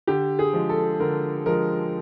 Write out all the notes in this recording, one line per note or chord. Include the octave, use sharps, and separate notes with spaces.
D3 G4
G#4
F3 G#3
A4
D3 A#4
F3 G#3 A#4